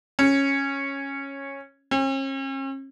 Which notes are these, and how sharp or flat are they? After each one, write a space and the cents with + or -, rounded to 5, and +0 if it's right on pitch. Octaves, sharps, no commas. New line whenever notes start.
C#4 -10
C#4 -45